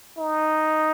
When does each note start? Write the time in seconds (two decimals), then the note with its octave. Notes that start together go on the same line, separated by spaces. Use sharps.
0.18 D#4